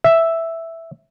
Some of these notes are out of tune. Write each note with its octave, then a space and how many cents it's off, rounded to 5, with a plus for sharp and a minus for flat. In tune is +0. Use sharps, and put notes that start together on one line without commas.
E5 +0